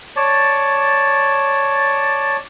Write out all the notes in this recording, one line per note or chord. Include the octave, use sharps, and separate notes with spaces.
C#5 D5 A5